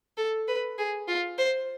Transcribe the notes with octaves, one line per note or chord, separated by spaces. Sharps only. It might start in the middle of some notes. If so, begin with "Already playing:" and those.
A4
B4
G#4
F4
C5